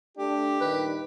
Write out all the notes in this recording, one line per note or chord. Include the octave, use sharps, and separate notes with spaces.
A3 D4 G4
G2 A#2 D#3 B4